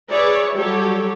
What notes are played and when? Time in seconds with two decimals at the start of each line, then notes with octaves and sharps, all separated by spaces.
0.11 G#4 B4 C#5 D5 E5
0.56 F#3 G3 G4 A4 C#5